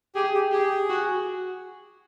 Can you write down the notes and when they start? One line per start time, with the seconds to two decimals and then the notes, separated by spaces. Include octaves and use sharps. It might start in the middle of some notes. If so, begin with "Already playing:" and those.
0.15 G4 G#4
0.34 G4
0.52 G4 G#4
0.90 F#4